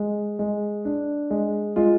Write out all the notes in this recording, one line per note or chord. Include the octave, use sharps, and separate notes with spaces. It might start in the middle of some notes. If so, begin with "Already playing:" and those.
Already playing: G#3
G#3
D4
G#3
G#3 F4